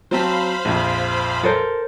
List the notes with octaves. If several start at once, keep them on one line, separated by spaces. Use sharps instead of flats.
F#3 C4 C5 F5 A5 B5
A#1 F2
A4 A#4 C5